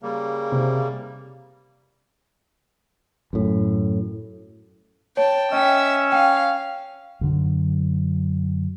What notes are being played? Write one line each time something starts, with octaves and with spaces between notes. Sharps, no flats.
C#3 G3 A#3
C3
F#2 A2
C#5 G5 A5
C#4 D#5 E5 G5 E6
F5 G5
F#2 D3 F#3